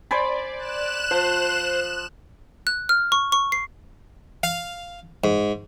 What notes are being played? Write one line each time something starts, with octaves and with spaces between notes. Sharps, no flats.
C5 D5 G#5 B5
F#6 E7
F3 C5
F#6
F6
C#6
C#6
C7
F5
G#2